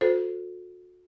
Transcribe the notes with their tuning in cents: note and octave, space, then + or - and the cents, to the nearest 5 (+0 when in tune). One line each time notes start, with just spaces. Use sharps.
F#4 -40 A4 +0 C5 -20